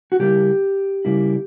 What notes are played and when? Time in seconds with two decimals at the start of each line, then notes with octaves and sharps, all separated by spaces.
0.12 F#4
0.19 C#3 G3 A#3 E4 G4
1.05 C#3 G3 A#3 E4